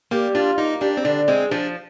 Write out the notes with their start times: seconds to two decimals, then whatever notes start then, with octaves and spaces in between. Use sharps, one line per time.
0.11 G3 A#3
0.35 D4 F4
0.58 A#3 D#4
0.81 G3 D4
0.97 C4
1.05 D3 D4
1.28 G#3 C4
1.51 F3 D4